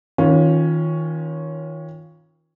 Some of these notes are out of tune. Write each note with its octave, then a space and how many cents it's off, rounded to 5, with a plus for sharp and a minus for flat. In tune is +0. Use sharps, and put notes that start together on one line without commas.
D#3 +35 C#4 +0 F4 +15